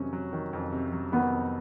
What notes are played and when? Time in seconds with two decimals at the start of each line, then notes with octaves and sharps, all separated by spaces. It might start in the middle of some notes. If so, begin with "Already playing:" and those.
Already playing: F2 C3 D#3 F#3 C#4
0.13 F#3
0.33 D#3
0.53 F2
0.73 C3
0.92 F#3
1.12 D#3 B3
1.32 F2